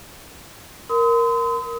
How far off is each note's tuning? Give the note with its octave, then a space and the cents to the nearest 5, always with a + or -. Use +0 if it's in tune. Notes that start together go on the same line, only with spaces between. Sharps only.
A#4 +0 C6 -40 D#6 +35